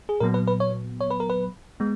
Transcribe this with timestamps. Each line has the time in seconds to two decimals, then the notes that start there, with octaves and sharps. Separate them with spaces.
0.09 G#4
0.20 A#2 F#3 B3 A#4
0.34 B4
0.47 B4
0.60 C#5
1.01 C#5
1.10 B4
1.20 A#4
1.30 B4
1.80 G#3 B3